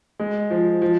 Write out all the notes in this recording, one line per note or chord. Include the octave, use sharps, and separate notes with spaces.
G#3
F3
F3